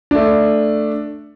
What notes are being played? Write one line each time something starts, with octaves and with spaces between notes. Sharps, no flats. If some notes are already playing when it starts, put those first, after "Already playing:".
A3 D4